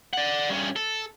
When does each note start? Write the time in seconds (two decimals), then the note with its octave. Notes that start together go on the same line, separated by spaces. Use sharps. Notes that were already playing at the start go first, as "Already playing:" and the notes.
0.13 D5 F#5
0.49 G2 C#4
0.76 A4